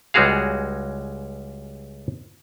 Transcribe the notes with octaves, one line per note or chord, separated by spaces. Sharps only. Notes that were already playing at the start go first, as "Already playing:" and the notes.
C#2 G3 G#3 F#4 G#4 F5